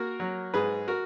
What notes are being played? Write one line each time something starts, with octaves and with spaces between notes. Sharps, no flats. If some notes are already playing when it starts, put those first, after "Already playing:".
Already playing: A#3 F#4 A#4
F#3
G#2 G#4 B4
F#4 A#4